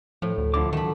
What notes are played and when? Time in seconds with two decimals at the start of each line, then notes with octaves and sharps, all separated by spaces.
0.22 A2 F3
0.38 D2
0.54 D3 F3 E4 D6
0.73 D#3 F#3 A3 B5